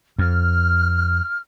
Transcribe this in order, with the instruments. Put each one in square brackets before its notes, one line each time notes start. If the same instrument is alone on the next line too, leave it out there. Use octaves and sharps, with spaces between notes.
[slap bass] F2 [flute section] F6